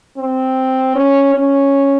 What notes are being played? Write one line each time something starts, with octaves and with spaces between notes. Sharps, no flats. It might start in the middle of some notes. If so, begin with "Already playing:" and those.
C4
C#4
C#4